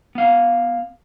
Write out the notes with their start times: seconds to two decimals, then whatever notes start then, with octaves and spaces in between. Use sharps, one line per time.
0.15 B3 F5